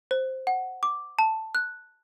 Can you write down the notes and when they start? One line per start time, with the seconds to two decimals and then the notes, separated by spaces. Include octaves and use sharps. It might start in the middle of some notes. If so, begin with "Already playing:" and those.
0.11 C5
0.47 F#5
0.83 D6
1.19 A5
1.55 F#6